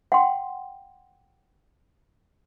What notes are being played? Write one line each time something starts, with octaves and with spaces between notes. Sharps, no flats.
F#5 G5 C6